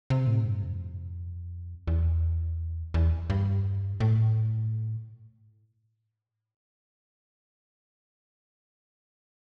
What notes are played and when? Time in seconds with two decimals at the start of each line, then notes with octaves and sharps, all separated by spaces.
0.10 C3
0.27 A2
0.45 G2
0.63 F2
1.87 E2
2.94 E2
3.30 G2
4.00 A2